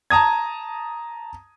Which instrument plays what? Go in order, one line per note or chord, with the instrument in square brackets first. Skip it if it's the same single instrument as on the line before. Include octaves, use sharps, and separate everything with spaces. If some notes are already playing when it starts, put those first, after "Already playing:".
[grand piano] A5 A#5 D#6 G#6